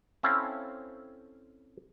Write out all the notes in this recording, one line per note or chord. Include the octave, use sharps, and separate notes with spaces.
C4 C#4 E4 A4 F5